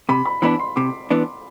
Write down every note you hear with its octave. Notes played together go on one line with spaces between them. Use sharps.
C3 B5
B5
E3 B3 D4 B5
C6
C3 D6
E3 B3 D4